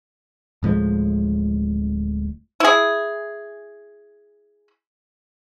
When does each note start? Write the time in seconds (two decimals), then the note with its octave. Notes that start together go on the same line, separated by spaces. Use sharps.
0.63 D1 A2 F3 G#3
2.60 E4 G#4